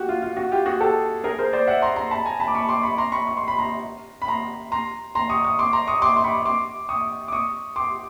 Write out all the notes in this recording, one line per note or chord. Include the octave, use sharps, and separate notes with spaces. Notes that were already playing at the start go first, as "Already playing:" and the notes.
Already playing: F#4 G4
F4
F4
F#4
F4 G4
F#4 G#4
G4 A4
G#4 A#4
A#4 C5
C5 D5
E5 F#5
A#5 C6
A#5 C6
A5 B5
G#5 A#5
A5 B5
D6
B5 C#6
C6 D6
B5 C#6
A#5 C6
B5 C#6
C#6
C6
B5
A#5 C6
B5
A#5 C6
A#5 C6
A#5 C6
C#6 D#6
C#6 D#6
C6 D6
A#5 C6
C#6 D#6
C6 D6
C6
B5 C#6
C6 D6
C#6 D#6
D6
C#6 D#6
C6 D6